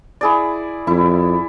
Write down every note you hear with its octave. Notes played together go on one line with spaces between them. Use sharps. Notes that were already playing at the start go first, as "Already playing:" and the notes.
E4 G#4 D5
F2 E4